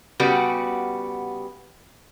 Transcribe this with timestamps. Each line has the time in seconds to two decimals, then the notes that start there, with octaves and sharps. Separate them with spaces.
0.20 C#3 G3 B3 F#4 G4